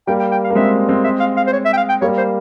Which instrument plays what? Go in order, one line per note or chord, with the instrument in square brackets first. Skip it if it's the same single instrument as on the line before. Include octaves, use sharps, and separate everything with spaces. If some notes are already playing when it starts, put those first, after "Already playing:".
[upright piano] G3 A#3 [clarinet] G5
[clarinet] G5
G5
F5
[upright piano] A#3
[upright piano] G#3 C4 [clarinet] E5
[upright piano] G#3 C4
[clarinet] E5
F5
F5
C5
C#5
E5
G5
F5
G5
[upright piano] G3 A#3 [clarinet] C#5
[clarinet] C5